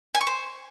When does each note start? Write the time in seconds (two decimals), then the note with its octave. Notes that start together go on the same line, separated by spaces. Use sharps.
0.15 G#5
0.21 C#6
0.27 C5